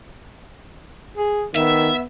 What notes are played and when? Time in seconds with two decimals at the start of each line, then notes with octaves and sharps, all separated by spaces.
1.17 G#4
1.55 D#3 B3 E5